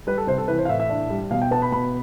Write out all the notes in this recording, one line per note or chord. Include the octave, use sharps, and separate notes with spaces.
G3 B4
A4
C3 C5
A4
E3 B4
C5
F5
A2 E5
E5
D4
G3
B2 F5
G5
B3 A5
B5
B2 B5